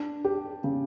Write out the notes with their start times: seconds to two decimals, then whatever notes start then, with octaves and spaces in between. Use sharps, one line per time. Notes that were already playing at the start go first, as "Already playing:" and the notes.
Already playing: D4
0.25 G4
0.64 C#3